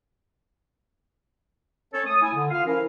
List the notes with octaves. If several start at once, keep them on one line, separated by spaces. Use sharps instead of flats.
C#4 A4 C#5
A3 D#6
E4 G#5
D3
F4 F5
F3 C#4 E4 A#4